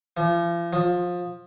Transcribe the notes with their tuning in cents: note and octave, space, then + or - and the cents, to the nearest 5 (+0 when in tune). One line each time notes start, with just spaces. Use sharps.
F3 -40
F3 +20